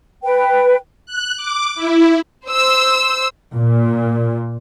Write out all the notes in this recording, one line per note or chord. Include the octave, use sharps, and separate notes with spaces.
B4 G5
F#6
D6
E4
C5 E6
A#2